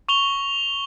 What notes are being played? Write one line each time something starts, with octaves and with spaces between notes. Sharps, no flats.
C#6 F7 G7